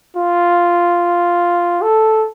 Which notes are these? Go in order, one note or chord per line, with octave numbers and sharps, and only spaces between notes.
F4
A4